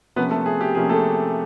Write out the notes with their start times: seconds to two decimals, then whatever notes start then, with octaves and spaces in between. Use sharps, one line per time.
0.16 C3 F3 A#3 B3 C#4 B4
0.31 A3 A4
0.46 G#4
0.61 G4
0.75 C3 F3 A#3 C#4 G#4
0.89 A3 A4